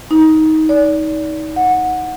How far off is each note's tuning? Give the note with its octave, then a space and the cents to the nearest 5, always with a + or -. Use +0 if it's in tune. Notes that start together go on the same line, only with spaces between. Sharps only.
D#4 +15
D5 -30
F#5 -15